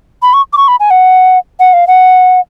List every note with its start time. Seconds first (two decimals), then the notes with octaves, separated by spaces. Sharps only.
0.22 B5
0.34 C#6
0.53 D6
0.57 C#6
0.68 B5
0.80 G#5
0.90 F#5
1.60 F#5
1.73 F5
1.87 F#5